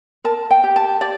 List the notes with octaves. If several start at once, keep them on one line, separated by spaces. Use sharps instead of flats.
A#4 A5
G5
G4
A5
G4 D5